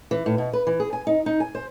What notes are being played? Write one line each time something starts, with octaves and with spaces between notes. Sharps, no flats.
E3
A2
B2
B4
E3
G#4
G#5
D#4
D#4
G#5
C5